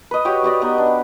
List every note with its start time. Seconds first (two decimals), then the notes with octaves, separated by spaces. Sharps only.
0.11 B4 D#5
0.25 F#4 G4 C#5 G5
0.43 F#4 G4 D5 D#5
0.62 B3 D#4
0.78 D4